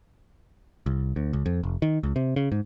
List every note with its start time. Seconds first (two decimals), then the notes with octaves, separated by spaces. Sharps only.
0.86 C2
1.16 D2
1.33 C#2
1.46 F2
1.63 F1
1.82 D#3
2.03 C#2
2.16 C3
2.36 C#3
2.52 G#2